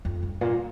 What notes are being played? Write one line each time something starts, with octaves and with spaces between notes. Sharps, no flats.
F2
G2
A#2